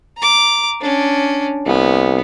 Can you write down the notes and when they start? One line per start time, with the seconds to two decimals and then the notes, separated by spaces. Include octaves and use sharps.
0.18 A#5 D6
0.81 C#4 D4
1.66 C2 B3